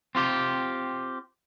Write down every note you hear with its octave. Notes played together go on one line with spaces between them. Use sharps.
C4 F4 G4